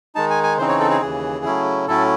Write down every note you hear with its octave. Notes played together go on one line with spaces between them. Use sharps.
D#3 G#3 D#4 A5
G#5
G#5
C#3 E3 C4 D#4 C5
C#5
A4
G#4
D#2 C#3 E3 G#4
C#3 F#3 A3 C#4 E4
A2 F#3 A3 C#4 E4 A4